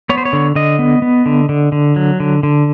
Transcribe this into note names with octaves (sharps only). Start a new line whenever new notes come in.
B3 C#5
C5
C#5
D3
D3 D#5
B3
B3
D3
D3
D3
F#3
D3
D3